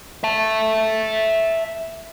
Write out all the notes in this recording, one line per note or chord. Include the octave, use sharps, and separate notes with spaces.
E5 A5